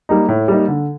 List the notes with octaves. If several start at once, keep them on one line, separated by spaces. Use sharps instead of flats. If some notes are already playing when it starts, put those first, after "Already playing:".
G3 A#3 D#4
A2
G3 A#3 D#4
D3